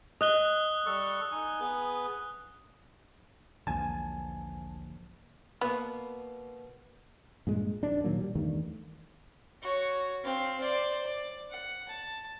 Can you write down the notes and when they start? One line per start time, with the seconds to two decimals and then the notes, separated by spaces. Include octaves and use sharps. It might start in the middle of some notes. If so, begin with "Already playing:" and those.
0.21 D#5 D#6 F#6 G7
0.86 G3 A4 C#6
1.31 D#4 G#5
1.60 B3 G#4 B4
3.67 B1 E2 G#2 D3 F3 A#3 G#5 A5
5.61 B2 A#3 B3
7.47 G2 A#2 G#3
7.83 D#1 A#1 D#2 D4
8.04 A#2 D#3 F#3 A#3
8.21 G3
8.35 E2 G2 D#3 A3
9.62 F#4 C#5
10.24 C4 F5
10.61 C5 D5
11.04 D5
11.50 F#5
11.89 A5